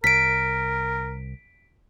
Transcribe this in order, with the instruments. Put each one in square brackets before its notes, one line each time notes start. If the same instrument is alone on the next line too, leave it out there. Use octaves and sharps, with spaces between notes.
[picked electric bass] C2 [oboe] A#4 [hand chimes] B6 D7